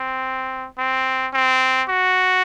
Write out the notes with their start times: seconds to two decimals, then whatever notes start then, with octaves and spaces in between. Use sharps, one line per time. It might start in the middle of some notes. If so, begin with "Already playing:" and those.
Already playing: C4
0.78 C4
1.34 C4
1.89 F#4